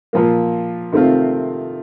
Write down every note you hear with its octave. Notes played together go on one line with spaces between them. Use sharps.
A#2 F3 A#3
C3 D#3 A3 C4 F4